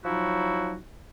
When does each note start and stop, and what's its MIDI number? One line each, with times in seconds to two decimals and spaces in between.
0.05 0.76 53
0.05 0.76 54
0.05 0.76 63
0.05 0.76 64
0.05 0.76 66